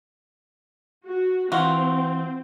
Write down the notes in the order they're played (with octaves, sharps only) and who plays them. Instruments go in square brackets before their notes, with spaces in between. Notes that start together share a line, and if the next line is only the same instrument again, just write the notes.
[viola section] F#4
[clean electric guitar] E3 F4 [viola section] C4 [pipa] F#4